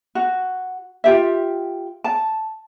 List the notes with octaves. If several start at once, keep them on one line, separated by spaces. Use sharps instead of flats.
F#4
F4 G4 E5
A5